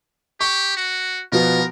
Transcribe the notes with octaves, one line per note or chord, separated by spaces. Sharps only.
G4 C#6
F#4
B2 F3 B3 A#4